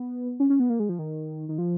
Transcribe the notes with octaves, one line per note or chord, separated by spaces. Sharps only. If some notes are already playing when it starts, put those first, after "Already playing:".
Already playing: B3
C#4
C#4
B3
A#3
G#3
F3
D#3
D#3
F3